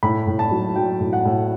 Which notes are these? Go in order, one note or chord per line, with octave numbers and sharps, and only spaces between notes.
A2 B5
A2
A5
F#3
F#3 G5
A2
F#5
A2